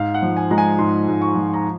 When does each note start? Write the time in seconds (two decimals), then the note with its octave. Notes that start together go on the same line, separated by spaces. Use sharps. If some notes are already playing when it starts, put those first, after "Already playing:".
Already playing: G#2 F5
0.14 F#5
0.22 F3
0.37 G#5
0.51 G#3 A#5
0.58 G#5
0.79 G#2 C6
1.08 G#2
1.22 C#6
1.36 F3
1.54 A#5